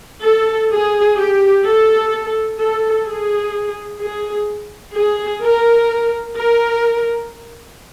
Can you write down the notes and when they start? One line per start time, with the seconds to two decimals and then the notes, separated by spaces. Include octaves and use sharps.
0.23 A4
0.70 G#4
1.17 G4
1.65 A4
2.59 A4
3.06 G#4
4.00 G#4
4.95 G#4
5.42 A#4
6.37 A#4